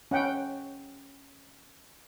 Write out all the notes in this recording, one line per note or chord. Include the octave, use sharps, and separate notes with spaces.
C#4 F#5 G5